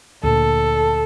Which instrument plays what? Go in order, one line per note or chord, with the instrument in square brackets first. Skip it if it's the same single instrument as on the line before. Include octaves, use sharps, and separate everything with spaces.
[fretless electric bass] D2 A#2 [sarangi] A4